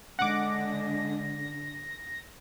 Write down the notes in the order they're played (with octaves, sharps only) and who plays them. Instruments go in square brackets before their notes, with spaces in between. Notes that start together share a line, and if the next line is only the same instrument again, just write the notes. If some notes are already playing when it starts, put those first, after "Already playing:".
[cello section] D3 D4 [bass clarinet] G#3 [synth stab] F#5 D6 [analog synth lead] A#6